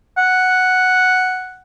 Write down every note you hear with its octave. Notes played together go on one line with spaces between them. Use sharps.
F#5